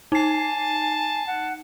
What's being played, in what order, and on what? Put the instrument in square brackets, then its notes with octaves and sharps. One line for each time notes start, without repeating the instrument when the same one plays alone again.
[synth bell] D#4 C7 [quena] G#5 [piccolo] A5
[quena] F#5